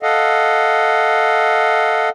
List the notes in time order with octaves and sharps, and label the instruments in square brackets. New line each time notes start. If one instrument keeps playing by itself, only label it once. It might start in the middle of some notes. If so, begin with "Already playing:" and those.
[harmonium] A4 D#5 F5 F#5